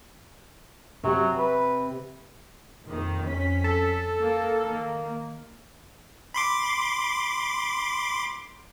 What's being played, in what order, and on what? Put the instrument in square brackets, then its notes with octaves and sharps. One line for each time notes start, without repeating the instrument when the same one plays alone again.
[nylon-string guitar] C3 [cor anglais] F#3
[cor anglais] B4
[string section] F2 A#2 D#3
F2 C#4 B6
[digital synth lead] A4
[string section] A#3
D#3 A#3
[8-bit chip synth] B5 C6 D6